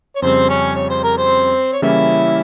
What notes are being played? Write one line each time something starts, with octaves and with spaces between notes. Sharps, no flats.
C#5
F2 C#3 G3 C4 C5
C#4 C#5
C#5
C5
A#4
C4 C5
C#5
C#3 E3 G3 A#3 C#4 E4 E5